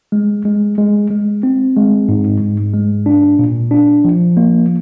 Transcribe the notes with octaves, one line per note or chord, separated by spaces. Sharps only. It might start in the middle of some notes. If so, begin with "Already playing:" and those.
G#3
G#3
G#3
G#3
C4
G#3
G#2
G#2
G#3
D4
A#2
D4
F3
A#3